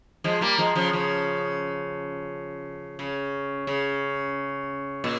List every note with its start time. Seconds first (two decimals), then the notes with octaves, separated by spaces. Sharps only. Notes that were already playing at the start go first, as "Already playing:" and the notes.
0.24 F3 G#3
0.41 G3 A#3
0.58 F3 G#3
0.75 C#3 F3
0.93 C#3 F3
2.99 C#3
3.67 C#3
5.04 A#2